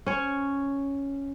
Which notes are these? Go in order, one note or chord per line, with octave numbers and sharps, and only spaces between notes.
C#4 C#5